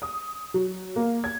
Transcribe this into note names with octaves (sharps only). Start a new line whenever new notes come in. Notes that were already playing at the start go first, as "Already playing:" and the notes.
D#6
F#3
A#3
G#6